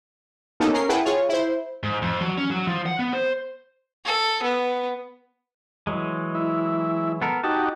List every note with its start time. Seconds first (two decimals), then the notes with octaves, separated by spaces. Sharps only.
0.60 A#3 B3 C#4 D#4 G4 A4
0.74 C#4 A#4 C7
0.89 E4 G#4 B4 F#5 G5 A5
1.05 F4 G#4 C#5
1.29 E4 C5
1.83 G#2
2.02 F2
2.21 F#3
2.38 C#4
2.50 F#3
2.67 F3
2.86 F#5
2.99 B3
3.13 C5
4.05 A4
4.43 B3
5.87 E3 F#3 G#3
6.35 E4
7.22 B3 A4 A#4
7.44 D#4 F#4 G4 A5